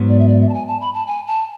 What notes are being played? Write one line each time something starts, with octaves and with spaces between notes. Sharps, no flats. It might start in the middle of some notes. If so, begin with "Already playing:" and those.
Already playing: G#2 F#3 B3
D5
E5
D5
E5
A5
G#5
A5
B5
A5
G#5
A5